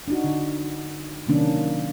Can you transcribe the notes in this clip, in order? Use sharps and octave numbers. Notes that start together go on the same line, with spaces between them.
D4 D#4 F#4
D3
C3 D#3 F#3 A#3 C#4 D4